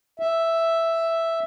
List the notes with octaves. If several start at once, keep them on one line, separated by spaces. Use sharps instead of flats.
E5